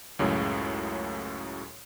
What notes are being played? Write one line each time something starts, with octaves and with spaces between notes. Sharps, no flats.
C#2 F#2 A2 C#3 F#3